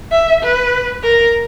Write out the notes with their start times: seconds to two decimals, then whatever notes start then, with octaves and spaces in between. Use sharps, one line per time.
0.11 E5
0.42 B4
1.03 A#4